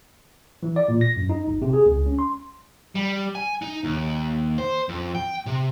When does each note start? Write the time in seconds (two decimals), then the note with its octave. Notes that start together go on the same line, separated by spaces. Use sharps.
0.63 E3
0.76 D5
0.88 A#2
1.01 A#6
1.16 F#2
1.29 D#4
1.48 G1
1.62 C3
1.73 G#4
1.86 C#2
2.06 C#4
2.19 C6
2.95 G3
3.35 G#5
3.62 D#4
3.84 D#2
4.58 C5
4.89 F2
5.15 G5
5.46 C3